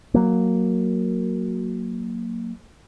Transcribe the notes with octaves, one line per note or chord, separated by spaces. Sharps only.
F#3 A#3